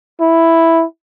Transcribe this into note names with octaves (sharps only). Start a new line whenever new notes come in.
E4